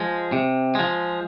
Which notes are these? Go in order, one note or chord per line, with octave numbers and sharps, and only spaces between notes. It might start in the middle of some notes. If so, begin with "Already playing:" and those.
Already playing: F3 G#3
C3
F3 G#3